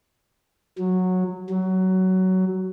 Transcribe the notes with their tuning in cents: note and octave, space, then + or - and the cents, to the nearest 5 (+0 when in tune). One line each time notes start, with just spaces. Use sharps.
F#3 -10
F#3 +15